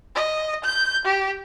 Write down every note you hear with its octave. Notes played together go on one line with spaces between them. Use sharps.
D#5
G6
G4